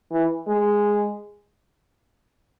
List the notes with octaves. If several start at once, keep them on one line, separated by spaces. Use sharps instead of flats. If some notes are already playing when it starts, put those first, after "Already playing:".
E3
G#3